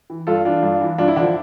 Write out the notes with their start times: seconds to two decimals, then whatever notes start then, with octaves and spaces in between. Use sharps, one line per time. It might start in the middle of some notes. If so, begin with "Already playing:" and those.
0.10 E3
0.27 G2 F4 A4
0.45 E3 D4 F4
0.63 G2
0.81 E3
0.98 G2 D4 F4
1.08 E4
1.16 D3 D4
1.20 F3